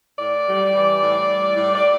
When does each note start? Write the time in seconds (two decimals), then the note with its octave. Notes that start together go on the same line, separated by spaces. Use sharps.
0.18 A2 D5
0.46 G3
0.73 E3
1.01 A2
1.29 G3
1.56 A2
1.75 D5